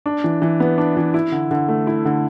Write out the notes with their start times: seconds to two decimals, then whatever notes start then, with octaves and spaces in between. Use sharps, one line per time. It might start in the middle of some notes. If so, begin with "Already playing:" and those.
0.06 D4
0.24 E3
0.42 E3
0.60 B3
0.78 D4
0.97 E3
1.14 E4
1.32 D3
1.51 D3
1.68 A3
1.87 E4
2.05 D3